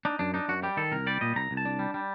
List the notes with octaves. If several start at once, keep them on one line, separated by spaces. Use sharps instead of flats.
D4 D#4
F#2 D4
D4 D#4
F#2 F#4
G3 G4
D#3 A4
C2 A#4
G3 D5
A#2 D#5
C2 A#5
C2
A5
D4
G3
G3